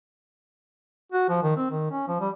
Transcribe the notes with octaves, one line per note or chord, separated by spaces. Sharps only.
F#4
F3
D#3
C4
D#3
C#4
F3
G3